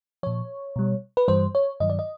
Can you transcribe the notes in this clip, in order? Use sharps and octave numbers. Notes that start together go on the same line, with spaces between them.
A#2 F3 C#5
B2 G3
B4
G2 E3 G3 C5
C#5
G2 D#3 F#3 D#5
D5
D#5